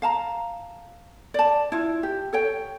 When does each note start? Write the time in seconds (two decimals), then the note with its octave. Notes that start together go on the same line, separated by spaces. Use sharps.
0.02 F5 A5 A#5
1.34 D5 A5
1.72 E4 F4
2.03 G4
2.33 A4 C#5 G5